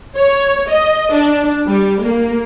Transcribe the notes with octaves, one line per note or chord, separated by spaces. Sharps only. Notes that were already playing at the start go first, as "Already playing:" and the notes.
C#5
D#5
D4
G3
A#3